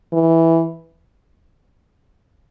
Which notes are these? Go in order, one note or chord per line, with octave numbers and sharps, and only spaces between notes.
E3